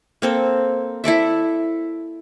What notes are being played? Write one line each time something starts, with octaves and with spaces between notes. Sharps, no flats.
A#3 C4 A4
E4 A4 D5 E5